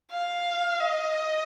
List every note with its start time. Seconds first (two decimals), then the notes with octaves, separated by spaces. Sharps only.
0.11 F5
0.80 D#5